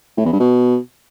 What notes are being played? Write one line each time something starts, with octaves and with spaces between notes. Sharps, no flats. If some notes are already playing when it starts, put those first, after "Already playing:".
A2
E2
G2
B2